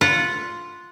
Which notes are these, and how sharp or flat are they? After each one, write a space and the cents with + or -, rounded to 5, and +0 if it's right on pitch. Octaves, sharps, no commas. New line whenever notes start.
F4 +0 F#5 -15